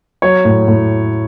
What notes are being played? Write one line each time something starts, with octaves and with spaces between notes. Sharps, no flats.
F#3 C#5
A2
A2